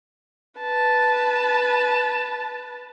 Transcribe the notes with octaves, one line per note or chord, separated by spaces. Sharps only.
B4 A5